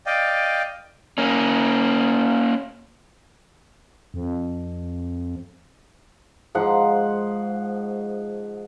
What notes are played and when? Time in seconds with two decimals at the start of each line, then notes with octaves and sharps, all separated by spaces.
0.06 D5 D#5 F5 G5
1.18 A#3 C#4
4.14 F2
6.55 G#2 F3 F#5